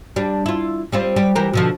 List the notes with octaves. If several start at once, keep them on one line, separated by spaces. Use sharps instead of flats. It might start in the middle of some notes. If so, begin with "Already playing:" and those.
G3 D4
E4 F4
G3 C4 F4
G3 G4
E3 G4 A#4
B2 D3 F3